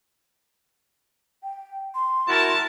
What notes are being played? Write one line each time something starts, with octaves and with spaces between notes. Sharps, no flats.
G5
C6
E4 F#4 A#4 A5